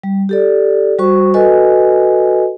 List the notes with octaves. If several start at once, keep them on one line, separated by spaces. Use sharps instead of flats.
G3
G4 A4 D5
G3 F#4 C5 C#6
F#4 A4 B4 D#5 G#5